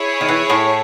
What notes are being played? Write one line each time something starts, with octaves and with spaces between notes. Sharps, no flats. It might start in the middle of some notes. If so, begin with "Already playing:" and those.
Already playing: E4 G#4 C#5
D#3
E3
A2 A3